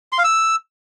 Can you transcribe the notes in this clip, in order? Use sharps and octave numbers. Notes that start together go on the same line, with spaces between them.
C6
F5
E6